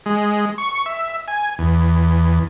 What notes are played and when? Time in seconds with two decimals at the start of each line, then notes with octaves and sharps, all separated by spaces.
0.06 G#3
0.58 C#6
0.86 E5
1.28 G#5
1.59 E2